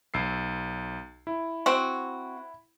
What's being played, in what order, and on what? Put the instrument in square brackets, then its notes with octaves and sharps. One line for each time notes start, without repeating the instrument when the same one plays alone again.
[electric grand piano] B1 E6 C7
E4
[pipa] C4 F#4